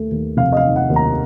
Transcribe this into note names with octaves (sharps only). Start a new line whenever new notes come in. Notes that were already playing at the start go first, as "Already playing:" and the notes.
Already playing: D#2 A3
D#2
F1 F5
D#5
F5
D#3
F#5
D#2
A#5